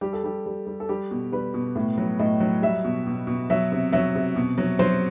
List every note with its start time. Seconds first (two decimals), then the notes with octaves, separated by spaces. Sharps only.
0.01 G3 G4
0.13 A4
0.24 G3 G4
0.46 G3
0.66 G3
0.80 A4
0.89 G3 G4
1.11 B2
1.32 G3 B4
1.54 B2
1.75 A2
1.98 F#3
2.19 A2 D#5
2.40 F#3
2.62 G3 E5
2.85 B2
3.07 B2
3.27 B2
3.50 F#3 E5
3.72 C3
3.92 F#3 E5
4.15 C3
4.36 B2
4.58 F#3
4.79 F#3 C5